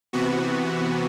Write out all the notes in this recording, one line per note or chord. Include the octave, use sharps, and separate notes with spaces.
C3 E3 B3 F#4